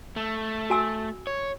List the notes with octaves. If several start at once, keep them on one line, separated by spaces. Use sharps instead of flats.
A3
F#4 G#5 E6
C#5